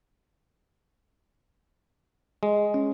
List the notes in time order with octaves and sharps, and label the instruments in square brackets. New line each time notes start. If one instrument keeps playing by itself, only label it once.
[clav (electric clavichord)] G#3
[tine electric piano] C#4